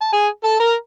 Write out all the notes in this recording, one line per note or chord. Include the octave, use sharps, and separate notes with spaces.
A5
G#4 G#5
A4 A5
A#4 A#5